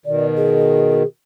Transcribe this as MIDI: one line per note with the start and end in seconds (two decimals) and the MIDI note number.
0.06 1.03 47
0.06 1.03 51
0.06 0.27 74
0.36 1.06 68